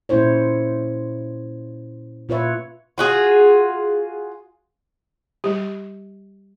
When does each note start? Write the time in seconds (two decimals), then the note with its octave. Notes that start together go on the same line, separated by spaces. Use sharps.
0.09 A#2 C#4 E4 C5 C#5
2.29 A#2 F4 B4 C#5 E5
2.98 F4 F#4 G#4
5.44 G3 G4